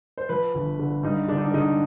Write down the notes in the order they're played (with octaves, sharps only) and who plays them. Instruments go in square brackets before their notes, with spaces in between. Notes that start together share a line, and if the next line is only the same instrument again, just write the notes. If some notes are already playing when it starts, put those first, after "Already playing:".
[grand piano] C5
F3 B4
G1
D3
G2 D#4
D3 D4
D#4
D4
D3 D#4